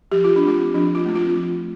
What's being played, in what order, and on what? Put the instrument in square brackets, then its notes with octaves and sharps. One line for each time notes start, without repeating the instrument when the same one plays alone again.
[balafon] F3 G4
F4
D4
A3 C4 F4
F3 D4
F4
A3 C4
F4
F3